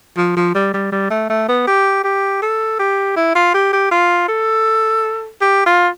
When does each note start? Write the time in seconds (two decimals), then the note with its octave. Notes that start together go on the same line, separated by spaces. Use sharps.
0.17 F3
0.37 F3
0.55 G3
0.74 G3
0.92 G3
1.11 A3
1.30 A3
1.49 B3
1.67 G4
2.04 G4
2.42 A4
2.79 G4
3.16 E4
3.35 F4
3.54 G4
3.73 G4
3.91 F4
4.28 A4
5.41 G4
5.66 F4